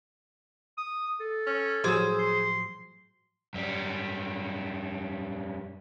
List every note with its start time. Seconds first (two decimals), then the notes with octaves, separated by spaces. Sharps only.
0.78 D#6
1.20 A4
1.47 C#4
1.84 A2 F3 F#3 G#4 C5 E6
2.19 C6
3.54 F#2 G3